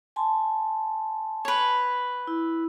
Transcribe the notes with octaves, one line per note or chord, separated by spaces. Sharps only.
G#5 A5 C6
B4 C#5
E4